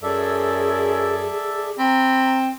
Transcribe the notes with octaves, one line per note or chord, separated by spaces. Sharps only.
F#2 G#4 A4 D5 E5
C4 A#5 B5